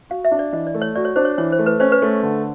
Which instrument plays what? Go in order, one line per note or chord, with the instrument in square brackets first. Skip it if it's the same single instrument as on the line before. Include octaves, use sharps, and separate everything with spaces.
[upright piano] F#4 [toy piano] F5
[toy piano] E5
[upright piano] D4
[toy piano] D5
[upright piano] E3 [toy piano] D#5
[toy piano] D5
[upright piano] A3
[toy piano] C#5
[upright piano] F#4 [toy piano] D5
[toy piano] C#5
[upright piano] D4 [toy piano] C5
[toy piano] C#5
[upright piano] E3 [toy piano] C#5
[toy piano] C5
[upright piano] A3
[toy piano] B4
[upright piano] C#4 [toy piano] C5
[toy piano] B4
[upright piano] A3
D3